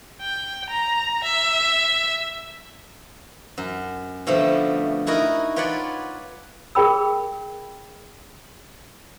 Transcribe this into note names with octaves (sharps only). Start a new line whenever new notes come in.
G5
A#5
E5
F#2
B2 D3 F3 A3
D#4 E4 F#4 A#4 D#5
F4 B4 C#5 D5 F#5 G#5
G#4 A#4 G5 B5 E6